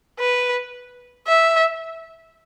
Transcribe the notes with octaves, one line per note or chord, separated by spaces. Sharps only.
B4
E5